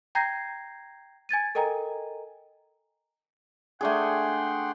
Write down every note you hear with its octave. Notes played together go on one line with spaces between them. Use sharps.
G5 A#5 G6 G#6 A#6 C7
G#5 G#6 A6 D#7
A4 A#4 D#5 G5 G#5 A#5
A3 D4 G#4 F#5 G5 C6